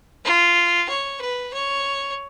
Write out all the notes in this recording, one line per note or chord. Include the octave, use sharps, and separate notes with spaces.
F4
C#5
B4
C#5